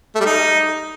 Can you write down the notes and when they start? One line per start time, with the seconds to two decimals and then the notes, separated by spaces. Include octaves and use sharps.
0.15 A3
0.20 G3
0.26 D#4